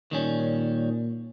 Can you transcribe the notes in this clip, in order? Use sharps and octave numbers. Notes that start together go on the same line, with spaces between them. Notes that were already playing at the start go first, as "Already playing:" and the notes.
A#2 D#3 G3 C#4